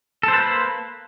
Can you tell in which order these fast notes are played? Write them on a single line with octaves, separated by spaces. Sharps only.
A4 C5 B4 A#3